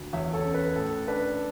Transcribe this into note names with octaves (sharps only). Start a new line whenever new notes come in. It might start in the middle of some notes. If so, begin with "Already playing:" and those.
Already playing: D2
E2 C#5 E5
A4 C#5
C#4
B4
A2 A4
D4 B4